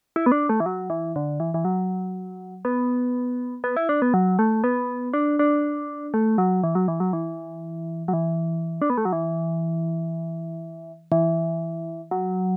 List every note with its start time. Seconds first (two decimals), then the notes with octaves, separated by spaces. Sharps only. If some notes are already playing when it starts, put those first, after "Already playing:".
0.16 E4
0.26 B3
0.32 D4
0.49 A3
0.60 E3
0.66 F#3
0.90 E3
1.16 D3
1.40 E3
1.54 E3
1.65 F#3
2.65 B3
3.64 B3
3.76 E4
3.89 D4
4.02 B3
4.14 F#3
4.39 A3
4.64 B3
5.14 D4
5.39 D4
6.14 A3
6.38 F#3
6.63 E3
6.75 F#3
6.88 E3
7.00 F#3
7.13 E3
8.08 F#3
8.13 E3
8.82 D4
8.90 B3
8.98 A3
9.05 F#3
9.13 E3
11.12 E3
12.11 F#3